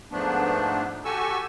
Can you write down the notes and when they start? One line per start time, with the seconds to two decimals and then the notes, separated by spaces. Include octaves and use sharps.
0.12 G#2 F3 A3 B3 D4
1.05 F#4 G4 A4 G#5 C#6 E6